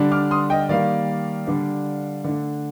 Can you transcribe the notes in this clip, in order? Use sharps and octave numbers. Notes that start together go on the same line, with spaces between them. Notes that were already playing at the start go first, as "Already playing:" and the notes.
Already playing: D3 G3 D4
D6 F6
C6 D#6
D#5 G5
D#3 G3 A#3 D5 F5
D3 G3 D4
D3 A3 D4